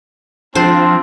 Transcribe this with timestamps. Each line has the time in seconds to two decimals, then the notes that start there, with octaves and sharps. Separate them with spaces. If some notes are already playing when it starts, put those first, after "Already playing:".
0.55 F3 C4 D4 C5